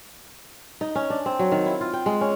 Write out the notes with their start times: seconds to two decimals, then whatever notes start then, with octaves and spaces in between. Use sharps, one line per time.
0.81 D#4
0.95 C#4
1.10 D4
1.26 C4
1.39 F#3
1.51 D#3
1.66 E4
1.81 F4
1.93 G5
2.06 G#3
2.21 C#4